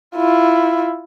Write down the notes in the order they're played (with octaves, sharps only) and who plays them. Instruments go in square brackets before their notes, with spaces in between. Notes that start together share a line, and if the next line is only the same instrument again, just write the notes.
[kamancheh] E4 F4